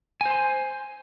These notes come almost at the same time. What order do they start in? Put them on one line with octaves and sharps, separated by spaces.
G#5 C5 C6